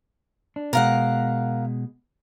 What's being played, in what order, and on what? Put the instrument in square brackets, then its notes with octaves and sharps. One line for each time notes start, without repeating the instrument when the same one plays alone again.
[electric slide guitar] D4
[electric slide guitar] B2 G#3 [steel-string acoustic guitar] A#4 F5 F#5